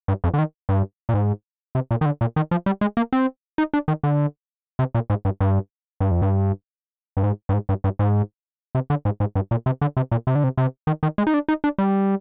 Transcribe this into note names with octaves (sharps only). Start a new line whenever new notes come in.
G2
F2
D3
D#3
G2
A#2
G#2
C3
A#2
D#3
D3
A#2
D#3
F3
G3
G#3
A#3
C4
D#4
D4
D#3
D3
C3
A#2
G#2
G2
G2
G2
F2
G2
G2
G#2
G2
G#2
G2
G2
G#2
C3
D3
G#2
G#2
G2
A#2
C3
D3
C3
A#2
C3
D3
C3
C3
D#3
D#3
G#3
D#4
D4
D#4
D4
G3